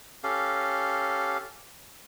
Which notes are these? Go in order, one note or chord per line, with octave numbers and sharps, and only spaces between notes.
C#4 G4 A4 F5